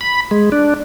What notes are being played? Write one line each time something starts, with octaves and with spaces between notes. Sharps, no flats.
B5
G#3
D4